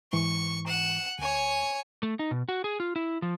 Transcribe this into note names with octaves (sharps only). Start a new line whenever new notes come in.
G#2 E3 C#6
F#5 E7
D2 C#5 G#5
A3
D#4
B2
F#4
G#4
F4
E4
F3